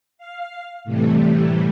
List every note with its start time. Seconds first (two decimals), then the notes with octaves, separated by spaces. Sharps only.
0.18 F5
0.84 A2 C3 E3 G3 A3